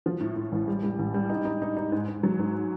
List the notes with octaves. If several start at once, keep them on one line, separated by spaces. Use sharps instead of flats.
F3
A2
A2
A1
G3
G3
A1
G3
D#4
D#4
D#4
D#4
G#2
G#2
F#3
G#2